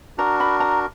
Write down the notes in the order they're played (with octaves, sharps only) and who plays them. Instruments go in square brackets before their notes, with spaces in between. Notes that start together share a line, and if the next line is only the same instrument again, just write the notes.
[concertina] D4 F#4 A#4 [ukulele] A#5
[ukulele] B5
A#5